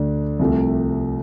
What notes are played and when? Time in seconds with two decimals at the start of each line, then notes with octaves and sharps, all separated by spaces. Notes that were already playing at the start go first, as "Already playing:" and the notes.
Already playing: D2 D3 A3 D4
0.39 C2 C3 F3 A3